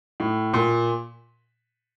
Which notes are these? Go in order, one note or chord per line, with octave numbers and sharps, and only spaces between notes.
A2
A#2